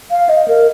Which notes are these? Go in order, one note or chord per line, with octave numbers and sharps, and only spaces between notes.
F5
D#5
A#4